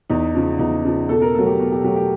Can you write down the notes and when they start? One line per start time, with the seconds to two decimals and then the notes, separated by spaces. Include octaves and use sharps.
0.09 E2 D#4
0.35 C#3 F3
0.59 E2 D#4
0.84 C#3 F3
1.09 B2 A4
1.22 A#4
1.34 F#3 A3 A4
1.46 G4
1.60 B2
1.72 G4
1.84 F#3 A3 G4
1.96 G4